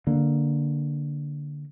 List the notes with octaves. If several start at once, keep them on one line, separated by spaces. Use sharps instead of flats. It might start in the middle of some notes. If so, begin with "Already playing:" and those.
D3 A#3